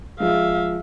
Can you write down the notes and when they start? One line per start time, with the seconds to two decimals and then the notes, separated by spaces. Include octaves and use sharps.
0.20 F3 G#3 E5 F5